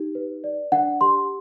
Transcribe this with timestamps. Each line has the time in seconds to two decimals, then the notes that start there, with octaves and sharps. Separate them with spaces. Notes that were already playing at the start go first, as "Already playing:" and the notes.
Already playing: D#4 G4
0.15 B4
0.44 D5
0.72 D4 F#5
1.01 G4 C6